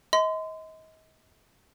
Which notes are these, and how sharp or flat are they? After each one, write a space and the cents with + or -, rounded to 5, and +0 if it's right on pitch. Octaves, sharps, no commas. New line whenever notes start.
D#5 +35 C6 -35